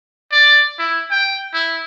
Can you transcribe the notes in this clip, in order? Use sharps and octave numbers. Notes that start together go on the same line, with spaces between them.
D5
E4
G5
E4